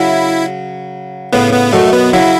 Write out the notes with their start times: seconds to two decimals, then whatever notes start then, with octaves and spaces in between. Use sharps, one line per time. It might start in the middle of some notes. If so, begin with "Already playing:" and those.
Already playing: C#3 F#3 E4
1.33 A2 C#3 B3
1.53 B3
1.72 F#2 B2 A3
1.93 B3
2.13 C#3 F#3 E4